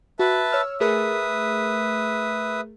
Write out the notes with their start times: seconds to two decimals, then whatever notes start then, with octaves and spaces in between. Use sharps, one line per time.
0.19 F#4 B4 E5 A5
0.53 C#5 E6 F6
0.80 A3 G#4 A#4 B4 E5 D#6